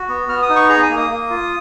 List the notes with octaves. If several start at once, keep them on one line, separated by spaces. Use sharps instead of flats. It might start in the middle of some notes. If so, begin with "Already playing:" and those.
Already playing: F#4
B3
B3 F6
D#6
D#4
C#6
G#4 A#5
G#5
A#3
D#6
A#3
F4